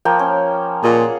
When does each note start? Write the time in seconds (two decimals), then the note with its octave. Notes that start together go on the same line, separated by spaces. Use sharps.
0.05 F3 A#3 G5
0.19 C#4
0.83 A#2 G#4 F5 F#5